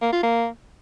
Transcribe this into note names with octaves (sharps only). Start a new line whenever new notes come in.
A#3
F4
A#3